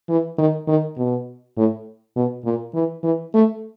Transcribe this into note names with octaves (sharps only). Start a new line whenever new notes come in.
E3
D#3
D#3
B2
A2
B2
A#2
E3
E3
A3